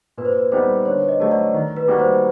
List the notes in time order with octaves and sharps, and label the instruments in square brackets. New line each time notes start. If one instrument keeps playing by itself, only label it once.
[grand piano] A#2 [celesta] B4
[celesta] C5
B4
[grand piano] G3 B3 D#4 [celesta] C5
[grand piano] D3 [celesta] C#5
[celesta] D#5
[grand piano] F#3 A3 [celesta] D#5
[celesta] D5
[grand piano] D#3
[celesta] B4
[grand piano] G3 A#3 D#4 F#4
[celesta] C5